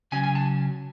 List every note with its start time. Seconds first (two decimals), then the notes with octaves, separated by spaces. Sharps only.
0.12 C#3 F#3 C#4 G#5
0.24 G#5
0.35 A5